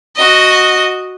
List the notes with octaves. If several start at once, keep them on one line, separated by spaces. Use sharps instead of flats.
F#4 D#5